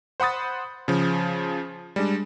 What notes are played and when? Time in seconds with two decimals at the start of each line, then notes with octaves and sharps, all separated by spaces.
0.20 C5 F#5 B5 D#6 A6
0.88 C#3 F3
1.96 G3 G#3 D4